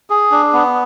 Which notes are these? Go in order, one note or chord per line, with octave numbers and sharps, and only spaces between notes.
G#4
D4
B3